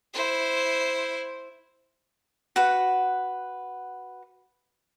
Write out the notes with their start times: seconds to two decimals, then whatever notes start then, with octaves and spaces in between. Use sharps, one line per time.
0.14 E4 C5
2.56 F#4 B4 F#5